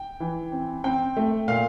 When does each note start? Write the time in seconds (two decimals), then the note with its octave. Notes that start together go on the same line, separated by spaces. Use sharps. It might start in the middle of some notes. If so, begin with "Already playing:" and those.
Already playing: G5
0.20 E3
0.52 C4
0.84 C4 G5
1.17 A3
1.48 A#2 F5